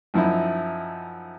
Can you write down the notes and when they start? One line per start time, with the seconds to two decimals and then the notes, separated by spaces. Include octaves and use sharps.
0.14 F#2 F3 D#4 E4